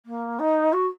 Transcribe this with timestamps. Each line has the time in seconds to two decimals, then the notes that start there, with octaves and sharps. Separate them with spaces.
0.06 A#3
0.39 D#4
0.73 F#4